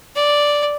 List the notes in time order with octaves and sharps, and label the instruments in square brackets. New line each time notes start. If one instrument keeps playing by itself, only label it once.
[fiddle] D5